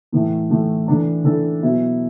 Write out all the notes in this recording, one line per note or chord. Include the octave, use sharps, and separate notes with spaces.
A2 E3 A3
A2 E3 A3
E3 D4 A4
E3 D4 A4
B2 F#3 B3 E4